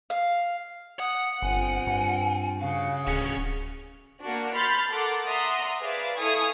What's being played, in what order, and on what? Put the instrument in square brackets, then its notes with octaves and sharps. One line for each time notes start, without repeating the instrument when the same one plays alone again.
[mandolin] F5
[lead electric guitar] F#5 [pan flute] D#6
[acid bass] G1 [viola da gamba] C4 F4 [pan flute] G#5
[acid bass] G2
[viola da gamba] C#3 F#4 C#5 [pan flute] F5
[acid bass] D1 [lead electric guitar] D2 C#4 [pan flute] G#4
[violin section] A#3 D4 F#4
B5 C6 F6 G6 A6 B6
A4 A#4 F#5 C6 D6 A6
D5 E5 F#5 A#5 C6 D#6
G#4 B4 C5 D5 E5 F5
E4 A4 F5 G#5 C#6 D#6